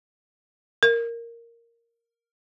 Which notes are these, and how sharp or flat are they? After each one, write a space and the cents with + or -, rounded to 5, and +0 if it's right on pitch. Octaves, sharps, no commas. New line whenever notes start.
A#4 -5